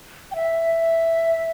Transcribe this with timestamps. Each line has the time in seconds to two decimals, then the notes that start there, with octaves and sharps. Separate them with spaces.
0.31 G5
0.35 E5